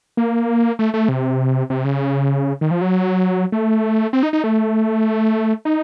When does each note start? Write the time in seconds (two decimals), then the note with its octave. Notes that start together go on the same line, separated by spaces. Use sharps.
0.17 A#3
0.79 A3
0.94 A3
1.09 C3
1.70 C3
1.85 C#3
2.61 D#3
2.71 F3
2.81 F#3
3.52 A3
4.13 C4
4.23 D#4
4.33 D#4
4.44 A3
5.65 D#4